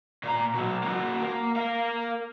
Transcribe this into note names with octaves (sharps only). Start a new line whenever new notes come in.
A#2 A#5
B2 F#3
A#3 F#4
A#3
A#4 F5